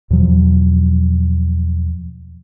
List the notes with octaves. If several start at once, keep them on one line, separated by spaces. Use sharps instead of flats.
E2 B2 F3 F#3